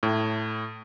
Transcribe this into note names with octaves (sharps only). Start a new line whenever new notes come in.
A2